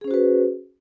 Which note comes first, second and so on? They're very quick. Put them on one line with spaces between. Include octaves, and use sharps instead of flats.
G#4 C#4 C5 F#4 B4